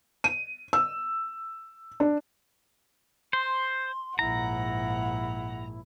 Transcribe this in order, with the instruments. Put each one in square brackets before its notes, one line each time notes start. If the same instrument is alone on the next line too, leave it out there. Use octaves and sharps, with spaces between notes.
[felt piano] D#7
E6
D4
[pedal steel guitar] C5 [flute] C6
[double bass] A#1 G#2 [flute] E4 [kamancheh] F#5 [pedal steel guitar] A#5